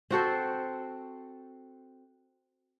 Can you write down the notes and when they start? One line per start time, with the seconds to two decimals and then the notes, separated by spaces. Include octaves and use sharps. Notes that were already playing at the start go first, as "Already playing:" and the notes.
0.11 C4 F#4 A4 C5